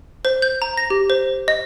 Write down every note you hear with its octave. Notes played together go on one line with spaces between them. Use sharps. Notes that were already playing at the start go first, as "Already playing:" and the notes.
C5
G6
A#5
A#6
G4
C5
D#5